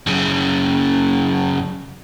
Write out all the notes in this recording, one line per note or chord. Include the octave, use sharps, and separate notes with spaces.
F#2 C#3